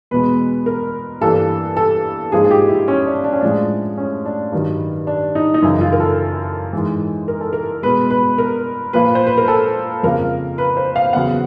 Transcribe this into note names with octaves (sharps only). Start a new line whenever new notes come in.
E2 B2 G#3 B4
A#4
G2 E3 G3 A#3 A4
A4
G#2 F3 A#3 G#4
G#4
G4
E4
C#4
D4
D4
C#4
A2 F3 G#3 D4
C#4
D4
G2 D#3 F#3
D4
D#4
D#4
F#2 C#3 E3 E4
F4
A#4
A4
G#2 E3 G#3
A#4
A4
A#4
B2 G#3 B4
B4
A#4
A#2 F3 A#3 B4
C5
B4
A#4
A4
F2 C#3 F3 A#3 A#4
B4
C5
F5
E2 C#3 F#3 F#5